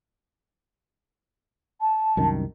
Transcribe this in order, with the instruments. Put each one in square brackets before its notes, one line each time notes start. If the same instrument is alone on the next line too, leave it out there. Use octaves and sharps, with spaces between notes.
[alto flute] A5
[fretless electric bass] C2 F#2 D#3